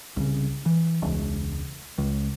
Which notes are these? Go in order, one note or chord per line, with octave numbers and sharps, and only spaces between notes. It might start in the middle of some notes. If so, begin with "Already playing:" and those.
C2 C#3
E3
E1 C#2
C#2